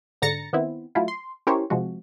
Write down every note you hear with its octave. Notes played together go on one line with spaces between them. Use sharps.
G#2 D3 A#5 A6 A#6 C#7
D#3 B3 C4 E4
F#3 A3 E4 F4
C6
C#4 E4 G4 A#4 C5 C#5
C3 F3 G#3 F#4